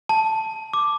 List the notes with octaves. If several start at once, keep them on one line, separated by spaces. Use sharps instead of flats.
A5
D6